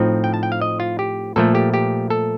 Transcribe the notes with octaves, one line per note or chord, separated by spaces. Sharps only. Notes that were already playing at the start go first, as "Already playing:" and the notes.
Already playing: A2 F3 C4 D#4
G5
A5
G5
F5
D#5
F4
G4
A#2 F3 A3 A4
G4
G4
A4